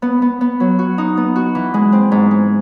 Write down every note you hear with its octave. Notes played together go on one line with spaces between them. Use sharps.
B3
B3
B3
F#3
F#4
D#4
B3
F#4
E3
G#3
C4
G#2
G#3